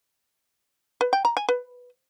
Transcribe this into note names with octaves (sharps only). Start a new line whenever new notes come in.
B4
G5
A#5
G#5
B4